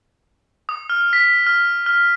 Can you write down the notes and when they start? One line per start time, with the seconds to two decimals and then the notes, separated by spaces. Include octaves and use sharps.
0.69 D#6
0.90 F6
1.13 B6
1.47 F6
1.86 F6